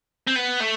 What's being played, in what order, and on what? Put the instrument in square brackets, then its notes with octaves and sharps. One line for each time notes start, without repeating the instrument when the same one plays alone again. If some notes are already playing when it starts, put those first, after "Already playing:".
[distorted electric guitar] C4
B3
A3